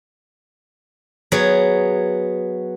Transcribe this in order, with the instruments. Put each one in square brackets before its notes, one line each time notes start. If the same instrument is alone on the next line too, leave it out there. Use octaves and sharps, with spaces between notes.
[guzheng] F#3 B3 G#4